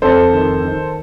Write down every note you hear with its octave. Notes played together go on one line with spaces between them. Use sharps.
F2 A4 C5
D#3
D#3